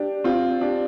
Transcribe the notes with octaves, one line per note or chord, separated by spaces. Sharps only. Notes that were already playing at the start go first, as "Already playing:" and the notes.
Already playing: D4 G4
C4 F4
D4 G4